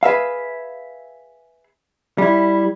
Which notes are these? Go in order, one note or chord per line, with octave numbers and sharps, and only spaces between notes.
G#4 B4 E5 F5
G3 E4